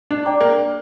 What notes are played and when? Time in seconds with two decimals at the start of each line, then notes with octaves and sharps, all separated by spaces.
0.11 D4
0.25 D5 G5 A#5 D6
0.41 A#3